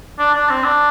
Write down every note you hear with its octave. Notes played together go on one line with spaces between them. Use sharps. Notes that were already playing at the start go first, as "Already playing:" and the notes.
D4
D4
C4
D4